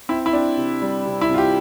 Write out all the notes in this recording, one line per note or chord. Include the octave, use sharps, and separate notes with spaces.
C4 E4
E4
C4 D4
C3
G3
C3
E4
C3 F4
G4